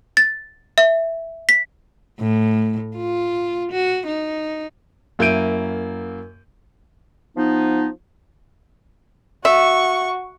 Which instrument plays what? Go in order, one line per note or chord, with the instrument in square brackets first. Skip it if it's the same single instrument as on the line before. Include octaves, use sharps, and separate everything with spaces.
[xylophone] A6
E5
B6
[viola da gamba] A2
F4
F#4
D#4
[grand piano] F#2 A#3 E4 G6 D7 D#7
[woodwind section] F3 B3 D#4
[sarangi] F#4 [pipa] E5 [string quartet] C#6